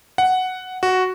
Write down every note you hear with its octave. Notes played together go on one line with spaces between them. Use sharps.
F#5
F#4